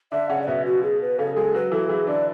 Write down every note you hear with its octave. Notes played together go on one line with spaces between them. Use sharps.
D3 D4 E5
C#3 C#4 F#5
D5
B2 B3 E5
F#4
G#4
B4
C#3 C#4 A4
G#3 G#4 A4
F#3 F#4 B4
E3 E4 A4
E3 E4 G#4
D3 D4 D5